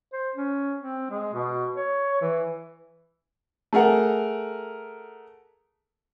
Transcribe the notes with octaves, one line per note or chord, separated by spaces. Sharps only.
C5
C#4
C4
G#3
B2
C#5
E3
A3 G#4 A#4 F#5